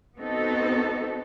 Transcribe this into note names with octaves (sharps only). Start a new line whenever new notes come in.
B3 C4 D#4 F#4 A4